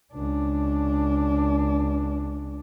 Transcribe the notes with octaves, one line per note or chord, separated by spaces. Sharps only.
C#2 D4